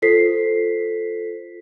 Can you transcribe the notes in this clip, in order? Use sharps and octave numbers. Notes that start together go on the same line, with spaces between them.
F4 A4 C5 B6 C7